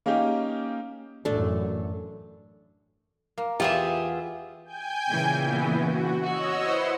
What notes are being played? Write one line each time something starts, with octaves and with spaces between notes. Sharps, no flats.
A#3 C#4 D#4 G4
A1 F#2 A3 D4
A#3
E2 B3 F4 G4 G#4 E5
G5 G#5 G6
A#2 C#3 E3
B3 E4
F#4
F#4 C#5 D#5 E6
E4 B4 C5 F#5